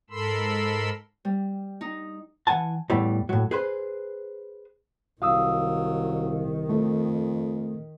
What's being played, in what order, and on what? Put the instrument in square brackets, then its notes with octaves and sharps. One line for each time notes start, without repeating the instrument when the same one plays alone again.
[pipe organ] G#2 A4 A#4 B5 C6 E6
[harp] G3
D#4
[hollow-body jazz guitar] E3 F#5 G#5 A5
E2 A2 E3 G3
A2 F#3
G#4 B4 C5
[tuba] C2 [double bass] D#3 [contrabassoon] F#3 [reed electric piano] F5 D#6 E6
[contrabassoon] F2 [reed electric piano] A3